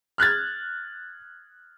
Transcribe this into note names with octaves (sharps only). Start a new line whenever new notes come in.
F6 F#6 G#6 A6